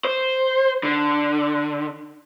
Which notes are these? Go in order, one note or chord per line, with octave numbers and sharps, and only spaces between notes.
C5
D3